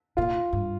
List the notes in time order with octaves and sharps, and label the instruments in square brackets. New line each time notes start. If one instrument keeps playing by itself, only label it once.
[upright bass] A#2 [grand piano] F4
[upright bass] G2